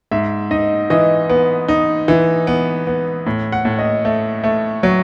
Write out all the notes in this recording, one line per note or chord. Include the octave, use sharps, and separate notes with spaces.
G#2 E5
D#4 D#5
E3 D#5
B3
D#4
E3
B3
B3
A2
F#5
A2
D#5
A3
A3
F#3